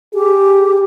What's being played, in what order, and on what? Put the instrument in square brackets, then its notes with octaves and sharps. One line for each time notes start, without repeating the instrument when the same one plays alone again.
[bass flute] G4 [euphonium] G#4